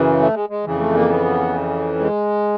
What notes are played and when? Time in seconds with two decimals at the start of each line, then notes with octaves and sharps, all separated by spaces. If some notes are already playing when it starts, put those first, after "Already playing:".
Already playing: F#2 C#3 E3
0.19 A3
0.34 G#3
0.50 G#3
0.65 F2 C#3 E3
0.80 A3
0.94 A#3
1.09 B3
1.99 G#3